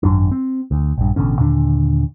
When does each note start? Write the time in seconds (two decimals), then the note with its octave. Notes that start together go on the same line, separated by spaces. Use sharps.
0.03 G#1 F#2 D4
0.31 C4
0.71 D2
0.98 A#1 G2
1.16 A1 B2 D3 C#4
1.38 D#2 A#2 D3 D4